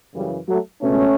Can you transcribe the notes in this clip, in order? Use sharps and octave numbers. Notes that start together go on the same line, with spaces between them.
F#2 C#3 E3 G3
F#3 A3
C#2 B2 A3 C#4